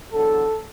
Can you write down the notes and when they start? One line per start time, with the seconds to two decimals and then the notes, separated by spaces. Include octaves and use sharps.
0.11 E2 D3 F#3 A4